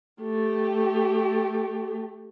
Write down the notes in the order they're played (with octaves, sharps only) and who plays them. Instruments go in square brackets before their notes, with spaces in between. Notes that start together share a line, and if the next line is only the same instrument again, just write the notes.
[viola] A3 G4